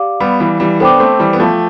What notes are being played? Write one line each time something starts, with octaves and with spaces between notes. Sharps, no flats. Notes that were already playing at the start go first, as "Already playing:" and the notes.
Already playing: G4 D5 F5 D6
G3 B3
E3 G3
E3 G3
B3 D4 A4 C5 G5 D6
A3 C4
E3 G3
B3
F3 A3